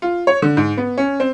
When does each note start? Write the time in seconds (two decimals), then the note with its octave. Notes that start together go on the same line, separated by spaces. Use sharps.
0.02 F4
0.27 C#5
0.42 D3
0.57 G#2
0.77 B3
0.98 C#4
1.20 C4